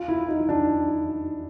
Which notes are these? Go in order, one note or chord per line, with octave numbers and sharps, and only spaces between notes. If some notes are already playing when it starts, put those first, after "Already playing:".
Already playing: F4
E4
D#4
D4